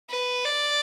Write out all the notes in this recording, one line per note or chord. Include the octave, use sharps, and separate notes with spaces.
B4
D5